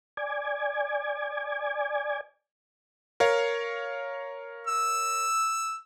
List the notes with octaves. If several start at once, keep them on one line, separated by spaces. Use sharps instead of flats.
D5 G#5
A#4 C#5 F5
E6